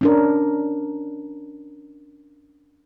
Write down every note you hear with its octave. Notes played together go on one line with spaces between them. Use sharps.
C#4 D4 A#4